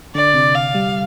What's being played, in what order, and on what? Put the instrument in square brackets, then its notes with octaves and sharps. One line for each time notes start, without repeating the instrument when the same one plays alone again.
[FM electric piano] D3 [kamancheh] D5
[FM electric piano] C3
[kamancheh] F5
[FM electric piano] G3